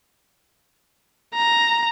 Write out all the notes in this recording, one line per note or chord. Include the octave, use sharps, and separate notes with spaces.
A#5